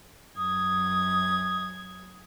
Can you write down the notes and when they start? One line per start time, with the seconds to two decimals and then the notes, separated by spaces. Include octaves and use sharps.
0.37 F#2 D#6 G#6